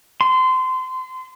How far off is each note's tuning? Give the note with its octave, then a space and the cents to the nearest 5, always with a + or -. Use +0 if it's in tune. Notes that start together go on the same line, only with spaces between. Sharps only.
C6 -25